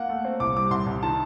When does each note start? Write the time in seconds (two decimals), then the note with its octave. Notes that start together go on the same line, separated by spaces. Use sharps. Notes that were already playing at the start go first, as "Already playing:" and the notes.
Already playing: A#3 F#5
0.09 A3
0.25 C4
0.40 C2 D6
0.56 G3 D6
0.71 C2 C6
0.87 C2
1.03 D#3 A5